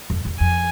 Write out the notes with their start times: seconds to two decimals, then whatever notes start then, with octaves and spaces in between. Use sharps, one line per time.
0.10 F2
0.25 E2
0.40 F2 G#5